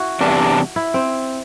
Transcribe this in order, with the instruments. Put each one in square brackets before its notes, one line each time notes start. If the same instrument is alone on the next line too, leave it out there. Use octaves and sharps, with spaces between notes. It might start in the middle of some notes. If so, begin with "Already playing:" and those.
Already playing: [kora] E4 F#4
[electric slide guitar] E2 C3 G3 D4
[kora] E4
C4